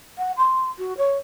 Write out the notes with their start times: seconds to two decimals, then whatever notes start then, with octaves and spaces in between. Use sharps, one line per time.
0.18 F#5
0.37 C6
0.78 F#4
0.98 C#5